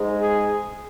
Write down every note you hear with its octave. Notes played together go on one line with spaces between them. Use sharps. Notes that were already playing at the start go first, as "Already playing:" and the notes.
Already playing: G#2 G#3
G#4